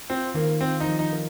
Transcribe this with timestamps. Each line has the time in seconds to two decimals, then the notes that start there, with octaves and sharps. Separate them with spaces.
0.10 C4 F4
0.35 D#3 A#3
0.61 C4 F4
0.80 D#4
0.86 F3
0.99 D#4
1.13 A#4